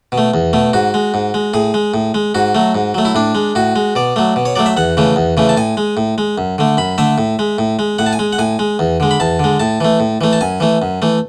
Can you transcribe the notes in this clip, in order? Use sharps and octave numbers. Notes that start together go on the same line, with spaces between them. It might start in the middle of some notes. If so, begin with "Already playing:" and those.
B2
A3
E2
B2 A3
G#2 F#4
G#3
G#2
G#3
A2 G#4
G#3
A2
G#3
G#2 F#4
F#3 A3
G#2
F#3 A3
E4
A2 D4
G#3
A2 F#4
G#3
B2 D5
F#3 A3
B2
C#5
F#3 A3 D5
E5
E2 F#5
C#3 E3 A3
E2
C#3 E3 A3
A5
A2 G#5
G#3
A2
G#3
F#2
D3 A3
F#2 B5
D3 A3 E5
A2
G#3
A2
G#3
A2 F#5
A5
G#5
G#3
F#5
A2 G#5
G#3
E2
D3 G#3
B5
E2 A5
D3 G#3
A2 A5
E3 A3
A2
E3 A3
A5
F#2 G#5
E3 A3
F#2
E3 A3